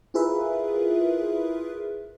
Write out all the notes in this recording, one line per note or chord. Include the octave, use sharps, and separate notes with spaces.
E4 F4 G#4 A#4 B4 E5